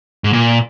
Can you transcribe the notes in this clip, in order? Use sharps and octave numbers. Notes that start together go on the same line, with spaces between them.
G#2
A#2